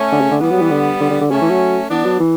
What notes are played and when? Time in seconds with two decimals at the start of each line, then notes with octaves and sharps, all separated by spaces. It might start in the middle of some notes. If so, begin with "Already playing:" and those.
Already playing: A3 C#4
0.12 D3
0.21 C#3
0.31 D3
0.41 E3 G3 B3
0.51 F#3
0.61 E3
0.71 D3
1.00 D3
1.10 D3
1.21 D3
1.31 C#3 A3 C#4
1.41 E3
1.50 F#3
1.90 E3 B3 D4
2.05 F#3
2.20 E3